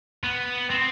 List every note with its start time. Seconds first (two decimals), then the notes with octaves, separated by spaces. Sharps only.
0.24 B3
0.70 C4